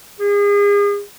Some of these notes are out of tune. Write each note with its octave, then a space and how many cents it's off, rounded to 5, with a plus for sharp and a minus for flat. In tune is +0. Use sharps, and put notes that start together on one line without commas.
G#4 -35